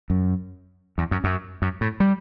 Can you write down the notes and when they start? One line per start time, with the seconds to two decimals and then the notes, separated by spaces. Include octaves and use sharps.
0.10 F#2
0.98 E2
1.11 F#2
1.24 F#2
1.62 F#2
1.81 A2
2.00 G3